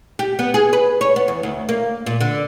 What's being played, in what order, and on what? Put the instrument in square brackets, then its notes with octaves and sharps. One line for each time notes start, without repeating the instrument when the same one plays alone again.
[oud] G4
B3
G#4
B4
C#5
B3
E2
D2
A#3
A#2
D3